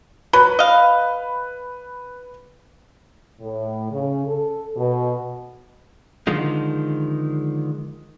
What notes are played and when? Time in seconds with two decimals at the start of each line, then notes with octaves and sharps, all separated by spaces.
0.33 F#3 B4 B5
0.59 D#5 F5
3.41 A2
3.91 C#3
4.27 A4
4.76 B2
6.27 D3 D#3 F3 G#3 D#4